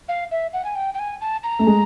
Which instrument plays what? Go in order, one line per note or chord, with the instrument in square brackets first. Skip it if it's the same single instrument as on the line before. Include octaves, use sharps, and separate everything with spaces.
[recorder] F5
E5
F#5
G#5
G5
G5
G#5
A5
A#5
[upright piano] A3
G#3